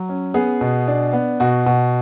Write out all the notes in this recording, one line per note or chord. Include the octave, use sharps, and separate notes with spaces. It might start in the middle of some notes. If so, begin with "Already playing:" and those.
Already playing: F#3
C#4
B3 G#4
B2
D4
B3
B2 F#4
B2